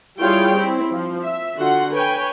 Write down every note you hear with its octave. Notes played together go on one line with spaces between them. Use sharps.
G3 E4 F4 G#4 C#5 G5
C4 E4
F3
E5
D3 F4 F#4 F#5 C6
B4 C#5 G5 G#5